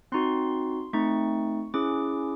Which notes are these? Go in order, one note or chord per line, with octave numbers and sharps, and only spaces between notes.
C4 D#4 F#4 C6
A3 C4 D#4 C#6
C#4 E4 G#4 D6